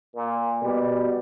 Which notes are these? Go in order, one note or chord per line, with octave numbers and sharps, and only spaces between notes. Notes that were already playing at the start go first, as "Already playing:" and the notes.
A#2
B2 G3